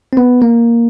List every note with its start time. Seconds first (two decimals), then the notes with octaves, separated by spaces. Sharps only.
0.13 C4
0.17 B3
0.42 A#3